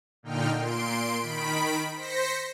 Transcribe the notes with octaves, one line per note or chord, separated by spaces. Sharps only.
A#2 D3 D#4 G5 F6
A#2 C6 D7
D#3 B5 B6 D7
C5 A#6 B6 C#7